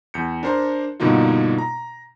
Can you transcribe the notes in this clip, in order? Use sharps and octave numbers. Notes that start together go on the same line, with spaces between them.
E2 G6 C#7
D4 A#4 C5 A#5 C6
G2 B2 D3 A#3 D#4 F4
A#5